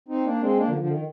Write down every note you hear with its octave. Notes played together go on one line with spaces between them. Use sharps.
C4 D#4
A#3 D4
G#3 C4
A#3 D4
D3 F3
D3 F3
D#3